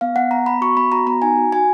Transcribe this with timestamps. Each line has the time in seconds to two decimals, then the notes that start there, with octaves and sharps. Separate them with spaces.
0.01 B3 F5
0.16 B3 F#5
0.31 B3 A#5
0.46 B3 B5
0.61 F#4 C#6
0.77 B3 B5
0.92 F#4 A#5
1.07 B3 A#5
1.22 D#4 G#5
1.37 F#4
1.53 F#4 G#5